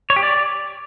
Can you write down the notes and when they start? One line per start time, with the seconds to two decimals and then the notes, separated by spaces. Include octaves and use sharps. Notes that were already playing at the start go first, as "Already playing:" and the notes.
0.10 C#5
0.16 G4
0.23 D5